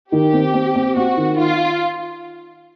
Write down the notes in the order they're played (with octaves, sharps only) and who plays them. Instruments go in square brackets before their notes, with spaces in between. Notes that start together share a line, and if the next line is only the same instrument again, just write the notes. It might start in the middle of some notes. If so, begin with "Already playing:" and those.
[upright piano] D#3 [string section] G4
[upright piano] C4
C4
C4
[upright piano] C4 [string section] F#4
[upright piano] D#3
[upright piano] D#4 [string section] F4